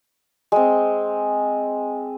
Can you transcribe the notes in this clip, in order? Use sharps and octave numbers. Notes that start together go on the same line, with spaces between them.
G#3 C4